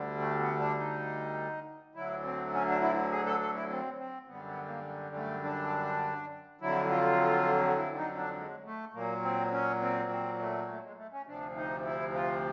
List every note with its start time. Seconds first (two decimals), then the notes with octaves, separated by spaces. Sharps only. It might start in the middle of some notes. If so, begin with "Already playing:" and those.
Already playing: D2 D3 G3
0.20 A3
0.40 B3
0.59 D4
0.78 D#4
1.95 D2 D3 F#3 E4
2.23 C4
2.53 C#4
2.68 D4
2.82 E4
3.11 G#4
3.26 A4
3.41 A4
3.55 E4
3.70 C4
3.98 C4
4.27 F#2 D3 G3 B3
4.47 B3
4.66 A#3
5.15 A3
5.44 D4
6.61 F2 D3 F#3 E4
6.90 F4
7.77 E4
7.96 D#4
8.16 D4
8.36 G#3
8.65 A3
8.93 A#2 F#3 A#3
9.22 C4
9.52 C#4
9.81 C4
10.10 C4
10.40 A3
10.68 A3
10.83 G#3
10.97 A3
11.12 C#4
11.26 D2 C3 F3 D4
11.56 D#4
11.85 E4
12.14 F4